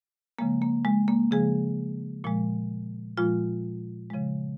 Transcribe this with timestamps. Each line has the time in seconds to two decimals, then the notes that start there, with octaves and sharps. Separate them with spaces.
0.39 C#3 F3 G#3 A#3
0.62 A#3
0.85 G#3
1.08 A#3
1.31 C#3 F3 G#3 G#4
2.24 A#2 F3 G#3
3.17 A#2 F3 G#3 F4
4.10 C#3 F3 G#3